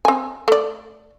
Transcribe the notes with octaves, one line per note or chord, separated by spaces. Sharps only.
C4 G#5
A3 D5